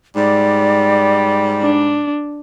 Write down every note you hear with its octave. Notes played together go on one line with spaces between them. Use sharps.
G#2 G3 D5
D4